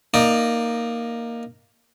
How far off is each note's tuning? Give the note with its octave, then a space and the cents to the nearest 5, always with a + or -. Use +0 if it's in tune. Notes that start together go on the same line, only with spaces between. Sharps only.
A#3 +0 D#4 +0 D5 +20